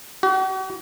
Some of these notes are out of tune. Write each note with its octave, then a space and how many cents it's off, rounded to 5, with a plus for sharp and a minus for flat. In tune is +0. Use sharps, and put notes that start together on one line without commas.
F#4 +45